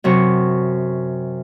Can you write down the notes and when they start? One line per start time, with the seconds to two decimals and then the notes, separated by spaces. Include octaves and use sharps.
0.04 F#2 C3 F#4 C#6